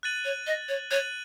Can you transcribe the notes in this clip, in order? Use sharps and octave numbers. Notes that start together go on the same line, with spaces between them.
F#6 A6 D#7 F#7
C#5
D#5
C#5
C#5 F#6 A6 D#7 F#7